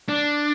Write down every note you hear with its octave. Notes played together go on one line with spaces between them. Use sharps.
D4